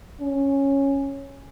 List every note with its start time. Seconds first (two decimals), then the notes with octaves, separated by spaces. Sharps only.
0.21 C#4